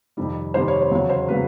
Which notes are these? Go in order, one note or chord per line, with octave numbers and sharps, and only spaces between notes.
F2 C3 D#3 G3
F2 C3 D#3 G3 C5
C#5
C5
E2 C#3 F#3 C#5
C5
C#3 F#3 B4